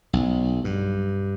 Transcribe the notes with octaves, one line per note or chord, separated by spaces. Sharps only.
B1
G2